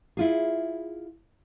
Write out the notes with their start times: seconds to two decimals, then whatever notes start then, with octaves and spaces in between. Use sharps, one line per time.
0.17 E4 F4 G#4